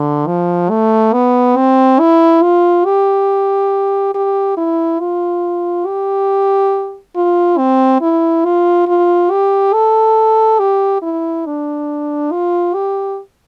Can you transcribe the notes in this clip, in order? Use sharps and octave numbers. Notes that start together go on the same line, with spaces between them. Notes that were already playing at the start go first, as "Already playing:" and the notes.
Already playing: D3
F3
A3
B3
C4
E4
F4
G4
G4
E4
F4
G4
F4
C4
E4
F4
F4
G4
A4
G4
E4
D4
F4
G4